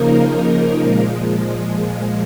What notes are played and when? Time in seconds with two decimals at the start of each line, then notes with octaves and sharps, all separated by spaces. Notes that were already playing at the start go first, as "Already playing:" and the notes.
Already playing: C#3 F3 A#3 D#4 A#4
0.80 A#2 F3 G#3